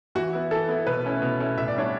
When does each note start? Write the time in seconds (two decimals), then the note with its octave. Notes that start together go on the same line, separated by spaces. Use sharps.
0.15 E3 F#4
0.33 B3 E4
0.51 E3 A4
0.68 B3 E4
0.87 B2 B4
1.04 A3 C#4 E4
1.22 B2
1.40 A3 C#4 E4
1.57 A2 E5
1.68 D5
1.75 G3 B3 D4 C#5